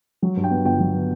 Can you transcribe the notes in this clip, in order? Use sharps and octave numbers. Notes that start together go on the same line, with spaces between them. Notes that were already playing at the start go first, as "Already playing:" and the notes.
F#3
G2
G5
B3
G1 G5
F#3